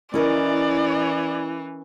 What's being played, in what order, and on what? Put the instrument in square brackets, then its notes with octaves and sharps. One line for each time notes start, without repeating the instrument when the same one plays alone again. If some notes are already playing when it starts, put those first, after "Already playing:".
[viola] E3 [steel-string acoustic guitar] C#4 A#4 D#5 [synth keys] E4 [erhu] D5